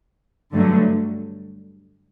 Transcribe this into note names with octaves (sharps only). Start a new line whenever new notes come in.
G2 D3 F#3 A3